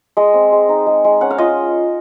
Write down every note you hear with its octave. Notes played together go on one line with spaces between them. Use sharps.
G#3 D#5
C4
G#3
D#4
G#3
G#3
C#4 F#5
F5
F4 D#5